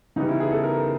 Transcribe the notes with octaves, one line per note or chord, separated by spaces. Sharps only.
C#3 E3 G3 B3 D#4
E4
G#4
A4
A#4